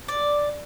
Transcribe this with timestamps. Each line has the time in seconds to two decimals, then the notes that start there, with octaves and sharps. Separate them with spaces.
0.08 D5